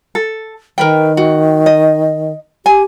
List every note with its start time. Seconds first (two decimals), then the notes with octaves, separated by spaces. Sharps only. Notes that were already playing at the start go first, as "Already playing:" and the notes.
0.15 A4
0.78 D#3 A#4 B4 G5
1.17 F#4
1.66 D#5
2.66 G4 G#5